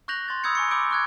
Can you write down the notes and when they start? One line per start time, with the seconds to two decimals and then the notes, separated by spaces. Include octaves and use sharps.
0.08 C#6 F#6 G6 A#6 F7 F#7
0.28 C6 A6
0.44 B5 D#6 E6 G6 G#6 C#7
0.55 G#5 C#6 C#7
0.71 B5 C6 D6 E6 G6 D7
0.91 C#6 F#6 G#6